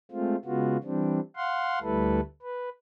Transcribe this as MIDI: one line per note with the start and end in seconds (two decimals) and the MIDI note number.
0.11 0.36 56
0.11 0.36 57
0.11 0.36 60
0.11 0.36 65
0.45 0.77 49
0.45 0.77 56
0.45 0.77 59
0.45 0.77 65
0.45 0.77 66
0.84 1.20 52
0.84 1.20 55
0.84 1.20 60
0.84 1.20 62
1.36 1.79 77
1.36 1.79 78
1.36 1.79 84
1.82 2.20 38
1.82 2.20 55
1.82 2.20 57
1.82 2.20 64
1.82 2.20 69
1.82 2.20 71
2.42 2.69 71